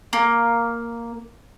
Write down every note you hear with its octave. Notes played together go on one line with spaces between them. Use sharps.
A#3